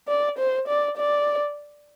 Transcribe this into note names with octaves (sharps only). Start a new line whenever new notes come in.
D5
C5
D5
D5